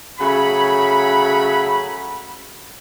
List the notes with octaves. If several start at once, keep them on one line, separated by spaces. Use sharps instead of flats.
C#3 F#3 A3 B5